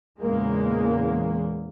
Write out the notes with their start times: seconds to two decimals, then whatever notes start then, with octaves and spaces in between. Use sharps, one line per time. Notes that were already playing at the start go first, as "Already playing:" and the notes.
0.20 E2 A#2 C#3 G#3 A#3